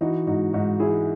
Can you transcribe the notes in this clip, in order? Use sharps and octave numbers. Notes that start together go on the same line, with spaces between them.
E3 D#4 F#4
G#2 D#4 F#4
G#2 D#4 F#4
E3 E4 G#4